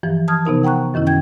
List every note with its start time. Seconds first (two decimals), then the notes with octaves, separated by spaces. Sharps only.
0.03 G2 E3 F3
0.28 A5 D#6 F6 G#6
0.45 C3 B3 D#4 A#4
0.63 F#5 G5 A#5 C#6 F#6
0.94 F#2 D#3 C#4 E4
1.07 G5 G6 G#6